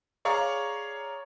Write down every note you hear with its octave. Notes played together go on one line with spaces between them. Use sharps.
G#4 C#5 D5 F5 A#5 C#6